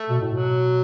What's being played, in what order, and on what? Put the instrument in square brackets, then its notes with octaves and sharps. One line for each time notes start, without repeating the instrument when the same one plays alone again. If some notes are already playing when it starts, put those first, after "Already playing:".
Already playing: [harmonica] A3
[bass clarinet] B2
A2
[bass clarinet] B2 [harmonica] F#3